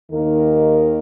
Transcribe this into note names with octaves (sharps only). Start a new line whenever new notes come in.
D#2 D#3 A#3 D#4 A#4